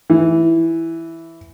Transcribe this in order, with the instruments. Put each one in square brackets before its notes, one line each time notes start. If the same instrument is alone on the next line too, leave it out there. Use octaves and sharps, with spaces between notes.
[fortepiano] E3